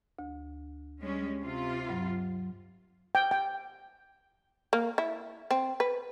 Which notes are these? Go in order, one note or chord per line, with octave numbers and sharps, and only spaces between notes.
D2
G3 G#3 C#4
C3 F4
G2 F#3
G5
G5
A#3
E4
C4
B4